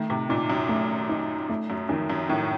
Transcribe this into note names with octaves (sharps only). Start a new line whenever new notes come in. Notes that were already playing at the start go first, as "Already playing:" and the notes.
Already playing: D#3 A3
C3
A#2 D#4
F#2
A3
D#4
A3
F#2
F2 D#3
F#2
A2 D#3